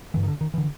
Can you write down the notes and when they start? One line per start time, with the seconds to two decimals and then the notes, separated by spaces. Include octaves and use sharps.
0.14 G2 D3 E3
0.23 D#3
0.28 D3
0.41 D#3
0.54 D3 E3